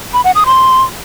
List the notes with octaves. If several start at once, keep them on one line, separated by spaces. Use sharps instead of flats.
B5
F#5
D#6
C6